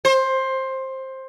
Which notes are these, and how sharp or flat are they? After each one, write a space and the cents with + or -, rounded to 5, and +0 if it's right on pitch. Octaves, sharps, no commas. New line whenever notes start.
C5 +15